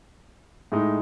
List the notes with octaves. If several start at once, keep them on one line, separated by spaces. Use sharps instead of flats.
A2 G#3 D#4